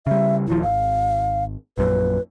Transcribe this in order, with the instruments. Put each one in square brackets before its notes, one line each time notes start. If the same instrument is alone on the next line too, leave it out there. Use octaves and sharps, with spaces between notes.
[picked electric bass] C#3 G3 [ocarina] E5
[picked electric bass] D#1 D#2 F3 [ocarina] E4
[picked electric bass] G#1 [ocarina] F5
[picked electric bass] A#1 F#2 A#2 [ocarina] B4